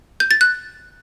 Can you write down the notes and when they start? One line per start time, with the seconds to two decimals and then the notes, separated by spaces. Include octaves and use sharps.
0.20 G6
0.31 A6
0.41 F#6